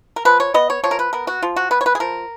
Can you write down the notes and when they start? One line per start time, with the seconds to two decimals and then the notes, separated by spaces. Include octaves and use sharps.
0.16 A#4
0.25 F3 B4
0.40 C#5
0.54 B3 D#5
0.70 C#5
0.84 F3 C#5
0.91 A#4
0.99 B4
1.13 B3 A#4
1.27 F#4
1.42 F3 F4
1.56 F#4
1.71 B3 B4
1.81 C#5
1.86 B4
1.95 G#4
2.00 F3 A#4